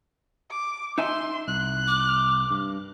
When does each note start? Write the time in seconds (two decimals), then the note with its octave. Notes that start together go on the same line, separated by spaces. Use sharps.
0.50 D6
0.98 D#4 E5 G#5 C6
1.48 C2 F#6
1.88 D6
2.50 G2